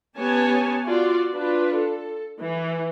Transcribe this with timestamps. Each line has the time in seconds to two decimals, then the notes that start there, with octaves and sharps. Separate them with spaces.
0.17 B3 C#4 G4 C#5 G#5 A5
0.85 F4 F#4 D5
1.32 D4 F4 B4
1.75 A4
2.39 E3